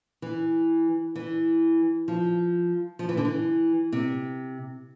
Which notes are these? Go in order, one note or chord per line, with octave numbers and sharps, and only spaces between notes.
E3
E3
F3
F3
E3
D3
E3
C3